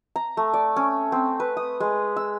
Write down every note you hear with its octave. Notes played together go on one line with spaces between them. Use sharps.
A#5
A3
D5
C#4
C4
B4
D#6
G#3
E6